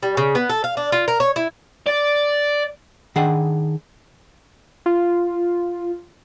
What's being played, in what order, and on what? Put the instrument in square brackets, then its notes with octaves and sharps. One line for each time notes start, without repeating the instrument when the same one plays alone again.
[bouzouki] G3
C#3
B3
A4
F5
D4
F4
A#4
C#5
E4
[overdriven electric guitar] D5
[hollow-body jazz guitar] D#3 D4 G#4 F#5
[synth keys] F4